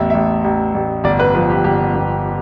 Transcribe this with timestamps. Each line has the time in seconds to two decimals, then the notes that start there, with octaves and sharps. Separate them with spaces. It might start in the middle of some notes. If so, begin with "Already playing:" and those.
Already playing: A1 E2 E5
0.10 A1 E5
0.44 A1
0.74 A1
1.04 G1 D5
1.20 B4
1.35 F3 B4
1.50 G4
1.64 G1 G4
1.95 G1